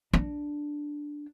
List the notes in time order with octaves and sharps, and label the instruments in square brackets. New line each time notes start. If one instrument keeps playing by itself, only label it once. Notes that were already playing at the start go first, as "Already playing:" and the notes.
[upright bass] D4